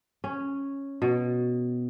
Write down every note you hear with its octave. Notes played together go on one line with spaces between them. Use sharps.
C#4
B2